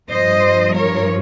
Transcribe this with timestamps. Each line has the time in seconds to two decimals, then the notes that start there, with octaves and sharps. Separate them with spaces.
0.11 G2 F3 C5 D#5
0.75 A#4 C#5